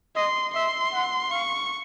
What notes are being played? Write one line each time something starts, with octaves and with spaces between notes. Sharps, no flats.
D#5 C6
E5 C6
F#5
F5 C#6